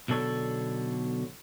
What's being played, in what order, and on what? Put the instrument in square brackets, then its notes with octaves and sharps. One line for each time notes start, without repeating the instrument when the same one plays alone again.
[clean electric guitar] B1 B2 D3 A4 C#5